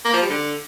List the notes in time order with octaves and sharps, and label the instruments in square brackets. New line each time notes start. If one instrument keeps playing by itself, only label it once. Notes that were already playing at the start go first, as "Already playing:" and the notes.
[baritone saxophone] A#3
F3
G3
D3